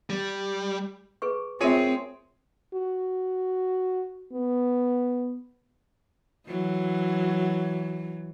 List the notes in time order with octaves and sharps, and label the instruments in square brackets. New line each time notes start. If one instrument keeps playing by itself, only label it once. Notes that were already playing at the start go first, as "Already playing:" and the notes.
[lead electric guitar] G3
[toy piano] G#4 B4 C#6
[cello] C4 [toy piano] F4 A#4 E5 [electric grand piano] G#4 C#5 D#7
[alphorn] F#4
B3
[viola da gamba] E3 F#3